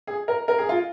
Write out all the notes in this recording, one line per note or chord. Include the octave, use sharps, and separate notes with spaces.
G#4
A#4
A#4
G#4
F4